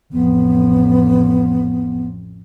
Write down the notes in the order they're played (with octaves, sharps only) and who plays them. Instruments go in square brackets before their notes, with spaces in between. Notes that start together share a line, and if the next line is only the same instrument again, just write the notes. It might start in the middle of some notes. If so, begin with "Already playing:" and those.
[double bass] A1 F2 [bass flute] B3